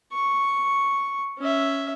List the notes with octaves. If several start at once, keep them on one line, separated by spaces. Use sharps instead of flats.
C#6
C#4 E5